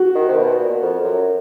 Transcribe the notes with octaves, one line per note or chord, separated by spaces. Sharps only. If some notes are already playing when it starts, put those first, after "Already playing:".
Already playing: F#4
D#3
C3
B2
A#2
F2
F#2